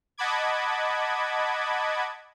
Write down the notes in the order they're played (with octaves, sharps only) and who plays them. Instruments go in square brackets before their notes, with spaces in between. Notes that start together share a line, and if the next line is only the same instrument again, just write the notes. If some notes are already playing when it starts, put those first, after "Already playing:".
[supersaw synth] D#5 F#5 A5 B5 D6 G#6